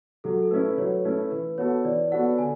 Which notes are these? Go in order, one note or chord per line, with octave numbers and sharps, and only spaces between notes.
F#3 A4
A4
A3 C#4 E4 B4
F#3 C#5
A3 C#4 E4
E3 B4
B3 F#4 A4 C#5
E3 D5
B3 F#4 A4 F#5
D3 G#5